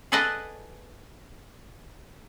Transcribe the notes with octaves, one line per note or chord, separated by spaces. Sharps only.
G#4 A4 B4 D5 D#5 F#5